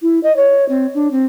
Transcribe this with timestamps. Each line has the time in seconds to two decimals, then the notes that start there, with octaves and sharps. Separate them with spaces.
0.02 E4
0.23 D#5
0.36 C#5
0.68 C4
0.94 D4
1.11 C4